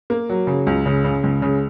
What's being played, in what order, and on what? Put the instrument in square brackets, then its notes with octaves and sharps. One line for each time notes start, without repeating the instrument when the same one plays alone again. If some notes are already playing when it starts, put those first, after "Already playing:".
[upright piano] A#3
F#3
C#3
C#2
C#3
C#3
C#2
C#3